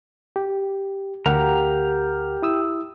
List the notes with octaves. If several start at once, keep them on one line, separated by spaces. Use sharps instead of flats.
G4
D2 G4 A#4 F5 F#5 A#5
E4 D#6 E6